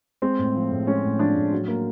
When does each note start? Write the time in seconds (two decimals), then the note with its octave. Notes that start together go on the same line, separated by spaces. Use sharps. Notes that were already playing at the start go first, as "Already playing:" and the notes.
0.22 G#3 C4
0.38 A2
0.55 F3
0.71 A2
0.87 G#3 C#4
1.04 A2
1.19 F3 D4
1.35 A2
1.52 F#3
1.68 A#3